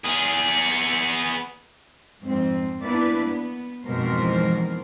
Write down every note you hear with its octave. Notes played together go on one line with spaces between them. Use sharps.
B3 G#4
F2 G#2 C4
A#3 B3 D4 E4 B4 D5
B3
F2 G#2 B2 E3 A#4 C5